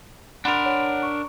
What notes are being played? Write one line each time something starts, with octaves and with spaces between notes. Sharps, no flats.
D4 A#4 F#5 B5 C6
C#5 F#5
C#6